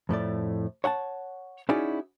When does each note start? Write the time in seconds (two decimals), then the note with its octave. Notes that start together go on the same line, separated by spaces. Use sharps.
0.09 F2 A2 A3 D5
0.84 C#5 F#5 G5 A5
1.69 C#4 D#4 E4 F#4 G#4 D5